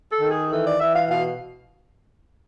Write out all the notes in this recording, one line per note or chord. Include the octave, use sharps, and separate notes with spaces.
A4
D#3
G#4
E3 A4
D5
E3 E5
F5
B2 F5